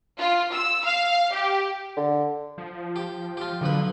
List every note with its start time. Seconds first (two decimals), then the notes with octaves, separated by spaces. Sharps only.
0.18 F4
0.53 E6
0.84 F5
1.33 G4
1.97 D3
2.58 F3
2.96 G4
3.37 F4 G4
3.61 B1 D3 F3 B4